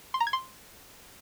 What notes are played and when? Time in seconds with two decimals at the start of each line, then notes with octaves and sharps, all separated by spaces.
0.14 C6
0.20 A#5
0.27 G#6
0.33 C6